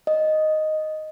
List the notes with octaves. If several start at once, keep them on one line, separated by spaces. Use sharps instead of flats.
D#5